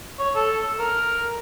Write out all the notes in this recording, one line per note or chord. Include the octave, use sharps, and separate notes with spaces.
C#5
A4
A#4